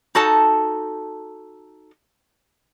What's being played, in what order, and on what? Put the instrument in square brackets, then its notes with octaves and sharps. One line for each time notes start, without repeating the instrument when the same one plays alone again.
[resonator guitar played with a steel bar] D#4 F#4 A4 A5